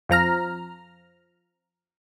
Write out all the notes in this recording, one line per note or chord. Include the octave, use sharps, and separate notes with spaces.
F2 F3 A#5 F6